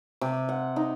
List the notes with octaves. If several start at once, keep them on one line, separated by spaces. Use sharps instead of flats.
C3
F#5
D#4